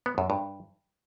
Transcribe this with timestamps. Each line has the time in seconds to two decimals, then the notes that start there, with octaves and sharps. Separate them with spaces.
0.06 B3
0.18 F#2
0.30 G2